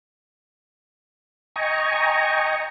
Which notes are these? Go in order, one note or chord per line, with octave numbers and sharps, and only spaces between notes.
D#5 G5 G#5 A#5 C#6